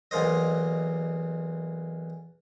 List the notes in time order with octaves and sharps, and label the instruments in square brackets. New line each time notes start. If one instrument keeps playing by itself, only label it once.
[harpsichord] B1 E2 A#3 C5 D#5